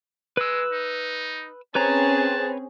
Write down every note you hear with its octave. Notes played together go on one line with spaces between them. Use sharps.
G#3 B4 E6
D#4
C4 C#4 G#4 B4 C#5 A5 A#5